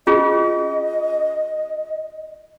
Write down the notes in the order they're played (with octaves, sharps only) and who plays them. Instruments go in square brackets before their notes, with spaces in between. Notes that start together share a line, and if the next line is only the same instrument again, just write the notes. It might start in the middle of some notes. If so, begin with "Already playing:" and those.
[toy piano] C#4 F4 G#4 [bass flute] D#5